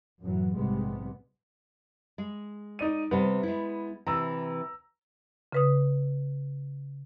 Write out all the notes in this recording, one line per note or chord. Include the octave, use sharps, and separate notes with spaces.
F#2 A2 E3 F#3
A#1 G#2 C3 G3 G#3 B3
G#3
D#4 D5 D#7
C3 G3 B3
G#3 E4
C3 E3 A#5 E6
C#3 B4 D#6